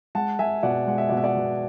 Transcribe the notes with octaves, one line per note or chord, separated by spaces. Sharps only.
G#3 F#5 A5
G#3 E5 G#5
B2 D5 F#5
G#3 F#5
E5
B2 D5 F#5
E5
D5 F#5
B2